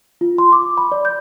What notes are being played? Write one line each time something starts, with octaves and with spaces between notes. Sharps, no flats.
F4
C6
D6
B5
D5
G6